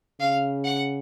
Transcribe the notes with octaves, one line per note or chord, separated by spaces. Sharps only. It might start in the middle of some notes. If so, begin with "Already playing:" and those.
C#3 F5
F#5